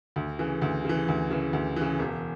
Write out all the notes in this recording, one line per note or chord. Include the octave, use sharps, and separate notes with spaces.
D2
C#3 E3
D2
C#3
E3
D2
C#3 E3
D2
C#3 E3
E1